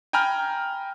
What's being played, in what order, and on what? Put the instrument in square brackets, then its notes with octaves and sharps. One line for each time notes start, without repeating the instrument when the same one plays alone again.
[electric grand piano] G5 G#5 A#5 B5 F6 G6